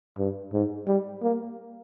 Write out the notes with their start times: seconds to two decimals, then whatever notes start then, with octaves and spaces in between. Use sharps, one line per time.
0.18 G2
0.53 G#2
0.87 G3
1.23 A#3